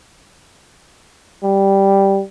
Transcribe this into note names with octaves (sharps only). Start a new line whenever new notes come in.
G3